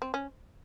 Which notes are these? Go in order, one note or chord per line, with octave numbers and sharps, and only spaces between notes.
C4
C#4